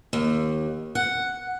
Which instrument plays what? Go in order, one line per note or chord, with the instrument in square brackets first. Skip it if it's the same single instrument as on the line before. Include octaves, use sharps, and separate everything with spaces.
[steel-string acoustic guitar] D#2
F#5